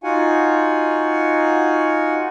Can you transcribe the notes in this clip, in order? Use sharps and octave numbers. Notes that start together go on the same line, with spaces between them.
D#4 F4 F#4 F5 F#5 G#5